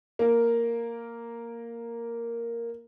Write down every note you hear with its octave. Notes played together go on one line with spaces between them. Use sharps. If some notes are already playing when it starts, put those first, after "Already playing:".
A#3 A#4